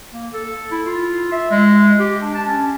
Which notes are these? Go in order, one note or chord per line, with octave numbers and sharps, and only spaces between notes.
A#3
A4
E4
F4
E5
G#3
G4
D4
A5
C#4